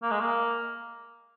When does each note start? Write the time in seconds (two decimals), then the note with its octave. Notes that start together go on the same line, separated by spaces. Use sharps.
0.03 A#3
0.11 G#3
0.20 A#3